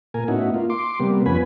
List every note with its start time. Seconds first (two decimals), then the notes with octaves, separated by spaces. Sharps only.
0.14 A#2 A#4 G#5
0.28 A2 B3 C#4 D#4 E4 F#4
0.54 A#3 F4
0.70 C6 D6
1.00 C3 G3 A#3 B3
1.26 F2 B3 C#4 B4 G#5 B5